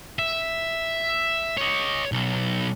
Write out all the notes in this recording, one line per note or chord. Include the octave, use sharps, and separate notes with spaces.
E5
C#5 D#5
B1